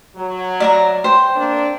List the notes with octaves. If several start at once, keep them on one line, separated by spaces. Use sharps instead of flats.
F#3
D5 E5 A#5
C5 G5
A#3 C4 D4